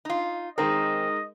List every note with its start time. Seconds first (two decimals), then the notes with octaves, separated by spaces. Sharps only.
0.05 D#4 F4
0.58 D#3 G#3 C4 D#4 A#4 D#5